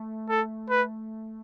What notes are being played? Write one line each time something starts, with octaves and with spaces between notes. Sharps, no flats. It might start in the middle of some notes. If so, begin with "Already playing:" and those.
Already playing: A3
A4
B4